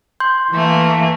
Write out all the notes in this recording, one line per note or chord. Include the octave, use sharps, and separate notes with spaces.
C6 G6
E3 A3 A#3